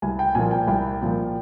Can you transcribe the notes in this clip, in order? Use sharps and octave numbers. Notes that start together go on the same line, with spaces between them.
C2 G#5
G5
A#2 F3 A#3 G#5
G5
C2 G5
A#2 F3 A#3